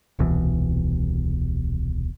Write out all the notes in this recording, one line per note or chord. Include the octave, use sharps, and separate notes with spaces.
D#1 C2 B2 E3